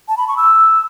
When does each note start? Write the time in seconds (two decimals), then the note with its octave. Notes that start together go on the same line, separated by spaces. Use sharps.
0.08 A5
0.17 B5
0.28 C#6
0.37 E6